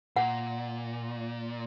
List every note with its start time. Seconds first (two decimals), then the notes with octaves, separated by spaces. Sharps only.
0.16 A#2 F#5